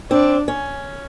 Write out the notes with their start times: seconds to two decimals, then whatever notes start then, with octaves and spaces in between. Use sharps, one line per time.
0.11 C4 D4
0.48 C#4